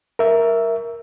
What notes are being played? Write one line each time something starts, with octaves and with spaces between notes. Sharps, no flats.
A#4 E5